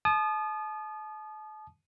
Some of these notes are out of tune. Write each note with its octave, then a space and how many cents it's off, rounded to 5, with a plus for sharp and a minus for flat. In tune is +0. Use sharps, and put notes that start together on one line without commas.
A5 -35 D#6 -30